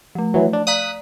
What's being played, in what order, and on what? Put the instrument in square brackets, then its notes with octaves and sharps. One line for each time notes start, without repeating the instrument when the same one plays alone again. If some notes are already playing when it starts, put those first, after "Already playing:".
[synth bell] F3 A3
[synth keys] E3 F#3
D4
[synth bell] D5 F5 A#5 [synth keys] D#6 F#6 B6